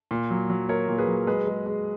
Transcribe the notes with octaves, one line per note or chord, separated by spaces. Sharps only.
A#2
F#3
F#3
A#3 A#4 C#5
A#2
G#4 B4
F#3
G#3 G#4 B4
G#3
G#3